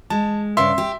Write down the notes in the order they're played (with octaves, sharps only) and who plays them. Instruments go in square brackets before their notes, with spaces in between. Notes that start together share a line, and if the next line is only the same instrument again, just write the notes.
[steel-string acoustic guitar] G#3 [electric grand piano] A5
[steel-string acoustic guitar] G2 C#3 D5 [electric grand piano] E5 C6
[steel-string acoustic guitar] G4